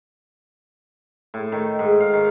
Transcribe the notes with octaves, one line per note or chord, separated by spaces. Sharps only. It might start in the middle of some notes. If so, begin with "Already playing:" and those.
A2
D#3
G#2
F5
D#3